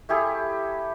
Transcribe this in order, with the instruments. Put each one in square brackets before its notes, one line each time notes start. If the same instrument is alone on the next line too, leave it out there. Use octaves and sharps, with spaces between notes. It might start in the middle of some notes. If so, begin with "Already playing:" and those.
[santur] A3 E4 G4 G#4